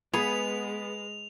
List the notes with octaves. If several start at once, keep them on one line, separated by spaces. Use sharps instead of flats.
G#3 B3 G#4 B4 F7